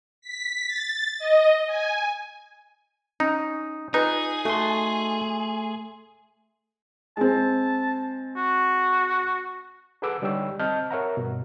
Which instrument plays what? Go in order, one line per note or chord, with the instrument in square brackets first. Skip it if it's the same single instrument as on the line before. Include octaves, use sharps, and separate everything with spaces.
[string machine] B6
A6
D#5
G#5
[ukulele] C#4 [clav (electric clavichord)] D#4
[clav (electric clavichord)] D#4 [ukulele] F4 B4 D5 [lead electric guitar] G#4
[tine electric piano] A3 C6 [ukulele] F#4 A4
[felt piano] G#3 C4 [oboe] A5
[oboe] F#4
[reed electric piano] G#4 A4 B4 F#5 D6 E6
D3 G3 D#4 C#5 G5 E6
C4 D#5 A5 F6 G6
A#4 C#5 E5 F#5 A#5
G2 B2